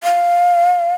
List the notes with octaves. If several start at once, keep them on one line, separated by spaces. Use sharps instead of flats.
F5